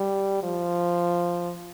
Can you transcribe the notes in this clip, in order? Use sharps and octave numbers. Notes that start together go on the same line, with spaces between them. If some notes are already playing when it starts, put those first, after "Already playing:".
Already playing: G3
F3